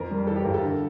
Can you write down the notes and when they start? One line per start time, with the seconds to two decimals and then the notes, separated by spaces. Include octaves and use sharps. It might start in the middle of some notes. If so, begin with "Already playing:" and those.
Already playing: F2 A#4
0.10 G3
0.27 E3 A4
0.36 G4
0.45 G1 A#4
0.54 A4
0.63 D3